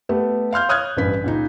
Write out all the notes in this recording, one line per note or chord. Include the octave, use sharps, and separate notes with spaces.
A3 B3 G4
F5 C6 F6 G6
C#5 D#6 F6 F#6 G#6
A1 G2 B4 B6
C#2 A#2 D#4